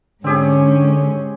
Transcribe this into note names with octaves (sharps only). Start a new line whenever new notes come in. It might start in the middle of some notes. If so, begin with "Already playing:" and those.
G#2 D3 C4 C#4 G4 G#4